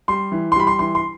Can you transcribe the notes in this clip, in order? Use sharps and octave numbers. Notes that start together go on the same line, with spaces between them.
G3 C6
E3
C6
G3 B5
C6
E3 C6
C6